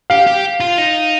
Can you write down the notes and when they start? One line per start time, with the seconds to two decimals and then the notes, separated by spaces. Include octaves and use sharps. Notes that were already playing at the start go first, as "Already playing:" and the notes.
0.10 G4 F5
0.27 G4
0.60 F4
0.78 D#4